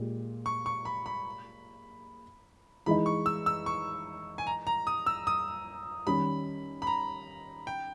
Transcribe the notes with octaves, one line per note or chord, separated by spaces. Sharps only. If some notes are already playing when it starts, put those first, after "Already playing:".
Already playing: A#2 G#3 G4
C#6
C#6
B5
B5
E3 G#3 D#4 B5
C#6
E6
E6
C#6
G#5
A#5
A#5
D#6
E6
D#6
D#3 G3 C#4 B5
B5
A#5
G5